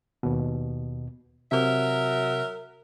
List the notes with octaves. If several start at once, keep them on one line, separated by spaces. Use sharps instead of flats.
D#2 B2
C3 F#3 A#4 E5